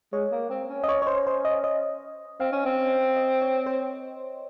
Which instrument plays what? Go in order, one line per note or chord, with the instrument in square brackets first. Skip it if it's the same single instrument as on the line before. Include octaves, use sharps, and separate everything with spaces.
[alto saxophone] G#3 [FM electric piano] C#5
[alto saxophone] A#3
C4
C#4
[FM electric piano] D#5
C#5
C#5
C5
C5
D#5
D#5
[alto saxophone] C4 [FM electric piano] F5
[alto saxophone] C#4
C4
[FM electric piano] D#5
C#5
C5